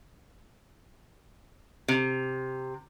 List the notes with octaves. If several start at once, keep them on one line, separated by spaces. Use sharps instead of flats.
C3